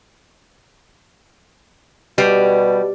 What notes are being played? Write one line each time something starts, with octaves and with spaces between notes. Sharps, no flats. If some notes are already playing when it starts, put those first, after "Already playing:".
B2 G3